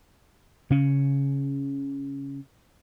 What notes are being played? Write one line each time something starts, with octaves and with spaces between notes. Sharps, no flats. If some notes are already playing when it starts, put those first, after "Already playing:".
C#3 C#4